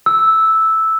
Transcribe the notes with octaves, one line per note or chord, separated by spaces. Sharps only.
E6